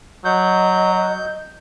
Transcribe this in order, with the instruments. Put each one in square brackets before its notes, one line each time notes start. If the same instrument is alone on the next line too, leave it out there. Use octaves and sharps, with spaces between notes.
[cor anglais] F#3 [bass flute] D#5 [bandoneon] G6